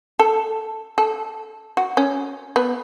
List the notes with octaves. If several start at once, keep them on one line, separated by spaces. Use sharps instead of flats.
A4
A4
F#4
C#4
B3